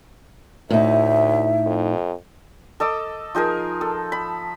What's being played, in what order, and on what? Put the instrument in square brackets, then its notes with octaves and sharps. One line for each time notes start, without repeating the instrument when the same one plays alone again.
[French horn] D2 [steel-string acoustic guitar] A2 D#4 [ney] E5
[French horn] F2
[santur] A4 D#5 D6 E6
F3 D#4 G#4 A#4
A4
B5